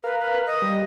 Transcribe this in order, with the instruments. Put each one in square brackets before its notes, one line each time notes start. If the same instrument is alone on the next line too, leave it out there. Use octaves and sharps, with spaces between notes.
[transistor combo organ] A#4 F5 [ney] B4
[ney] B4
D#5
[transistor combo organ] G3